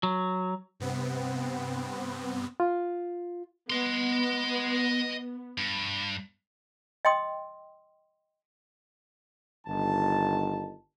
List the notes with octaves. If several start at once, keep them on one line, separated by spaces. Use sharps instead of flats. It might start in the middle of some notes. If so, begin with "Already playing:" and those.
F#3
G2 C3 B3 C4
F4
B3 D#5 C6
G2
D#5 G5 C6 D#6
G1 D#3 A5